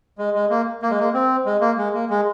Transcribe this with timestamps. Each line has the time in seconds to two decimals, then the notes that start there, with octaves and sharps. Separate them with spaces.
0.19 G#3
0.34 G#3
0.50 A#3
0.82 A#3
0.91 G#3
0.99 A#3
1.14 C4
1.46 G#3
1.61 A#3
1.78 G#3
1.94 A#3
2.10 G#3